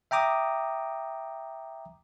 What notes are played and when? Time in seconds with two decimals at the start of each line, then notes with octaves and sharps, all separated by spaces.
0.11 E5 G5 A#5 D6 D#6